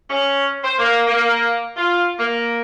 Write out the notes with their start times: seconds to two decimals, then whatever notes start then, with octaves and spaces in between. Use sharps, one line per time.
0.10 C#4
0.63 C5
0.78 A#3
1.06 A#3
1.76 F4
2.18 A#3